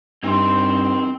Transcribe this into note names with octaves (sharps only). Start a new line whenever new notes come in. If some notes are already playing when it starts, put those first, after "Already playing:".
G2 E3 C4 D#4 C6